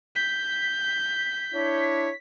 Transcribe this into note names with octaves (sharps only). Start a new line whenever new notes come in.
G6 B6
D4 E4 C#5